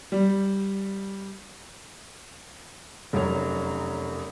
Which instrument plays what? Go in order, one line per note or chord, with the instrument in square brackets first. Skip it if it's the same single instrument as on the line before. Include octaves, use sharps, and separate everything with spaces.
[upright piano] G3
[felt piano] F1 F#2 C#5